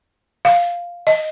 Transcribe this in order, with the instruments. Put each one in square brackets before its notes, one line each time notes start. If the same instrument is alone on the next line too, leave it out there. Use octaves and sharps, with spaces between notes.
[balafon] F5
D#5